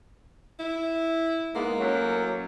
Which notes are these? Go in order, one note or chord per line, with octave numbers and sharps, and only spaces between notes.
E4
G#2 G#3 A#3 B3
F#2 A2 F#3